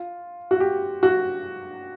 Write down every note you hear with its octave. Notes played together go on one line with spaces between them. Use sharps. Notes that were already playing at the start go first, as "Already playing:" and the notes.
Already playing: F4
F#4
G4
F#4